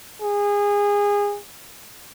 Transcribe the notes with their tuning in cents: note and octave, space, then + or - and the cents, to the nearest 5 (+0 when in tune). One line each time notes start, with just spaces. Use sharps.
G#4 -25